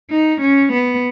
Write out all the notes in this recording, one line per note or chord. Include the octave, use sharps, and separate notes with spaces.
D#4
C#4
B3